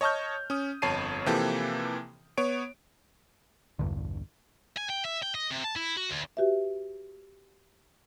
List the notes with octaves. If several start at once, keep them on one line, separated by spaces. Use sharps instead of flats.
C#5 D#5 A5 C#6 F6 G6
C#4 D#6
G1 F2 C#5 A5 C7 D#7
C3 E3 F3 A#3 G4 A4
B3 C#5 D7
B1 E2 G2 D3
G#5
G5
E5
G5
D#5
C3
A5
E4
F#4
D2
F#4 G4 B4 E5